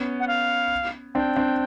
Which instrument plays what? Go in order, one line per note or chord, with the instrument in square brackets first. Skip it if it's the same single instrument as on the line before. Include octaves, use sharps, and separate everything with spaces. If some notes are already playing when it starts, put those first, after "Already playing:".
Already playing: [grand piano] B3 C#4
[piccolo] F#5
F5
[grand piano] C4 D4 [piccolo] G5
[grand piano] C4 D4